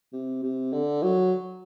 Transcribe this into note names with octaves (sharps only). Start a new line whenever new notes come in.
C3
C3
D3
F#3